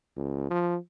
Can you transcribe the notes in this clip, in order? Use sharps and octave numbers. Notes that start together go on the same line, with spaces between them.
C#2
F3